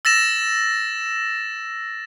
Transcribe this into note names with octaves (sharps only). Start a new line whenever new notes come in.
E6 A6 A#6 E7